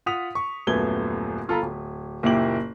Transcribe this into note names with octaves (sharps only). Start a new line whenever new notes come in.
F4 F#5 D#6 B6 F7
C#6
D#1 F#2 A3 B3 G#6 G7
G1 F4 A4 A#5 B5
D1
F#1 A#2 A#3 E4 G4 F#7